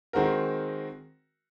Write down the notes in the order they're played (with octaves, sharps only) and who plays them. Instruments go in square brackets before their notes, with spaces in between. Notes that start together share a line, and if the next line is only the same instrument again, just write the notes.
[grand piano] D#3 G#3 C4 F#4 A#4